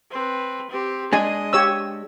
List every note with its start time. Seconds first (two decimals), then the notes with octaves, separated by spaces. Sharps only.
0.12 C4 B4
0.71 C4 G4
1.13 G#3 D4 D#5 G#5
1.53 G4 C#5 E6